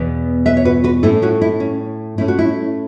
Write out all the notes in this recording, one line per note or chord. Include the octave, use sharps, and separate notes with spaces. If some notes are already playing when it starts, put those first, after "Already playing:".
Already playing: E2 B2 B3
B4 E5
C#5
F#4 B4
F#4 B4
A2 A3 C#4 E4 A4
C#4 F#4
E4
C#4
A2 A3 C#4 E4
F#4
E4